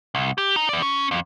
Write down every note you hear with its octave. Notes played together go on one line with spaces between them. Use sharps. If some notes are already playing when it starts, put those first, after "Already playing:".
C2
G4
D#4 A#5
E3 D5
C#4
F2